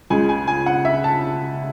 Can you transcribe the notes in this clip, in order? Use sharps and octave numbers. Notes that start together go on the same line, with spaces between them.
C#2 C#3 G#3 G#5
G#5
G#5
F#5
E5
A5